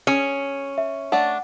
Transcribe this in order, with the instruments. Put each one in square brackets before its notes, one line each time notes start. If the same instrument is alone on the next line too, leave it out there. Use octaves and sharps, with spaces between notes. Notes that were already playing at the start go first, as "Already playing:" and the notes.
[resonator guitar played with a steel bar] C#4 [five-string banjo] G#4
[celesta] E5
[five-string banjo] A3 D4 [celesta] F#5